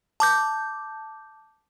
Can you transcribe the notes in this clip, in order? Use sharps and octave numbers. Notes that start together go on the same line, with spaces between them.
A5 D6 G6